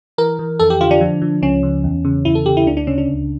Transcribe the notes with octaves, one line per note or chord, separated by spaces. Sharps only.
E3 A#4
E3
F2 A4
G4
D3 F4
D4
F3
F3
C#2 C#4
C#3
E2
C#3
E2 E4
A4
C#3 G4
E4
D2 D4
D4
C#3 C#4
D4
C#2